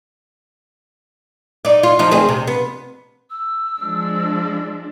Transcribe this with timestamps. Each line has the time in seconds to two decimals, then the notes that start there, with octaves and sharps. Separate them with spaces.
1.65 D#4 D5
1.83 F4
1.99 F3 D#4
2.11 D2 C4 G#4
2.29 C3
2.47 B3
3.30 E6
3.79 F3 G#3 D4